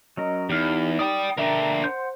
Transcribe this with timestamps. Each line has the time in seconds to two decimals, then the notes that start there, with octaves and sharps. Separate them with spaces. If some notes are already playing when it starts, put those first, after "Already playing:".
0.17 F#3 C#4 A#4 D#5
0.50 E2 D#4 G4 F6
0.99 D5 G5 D#6
1.38 D3 D4 A#4 E5 G5 A#5
1.84 C5 F#5 C6 G6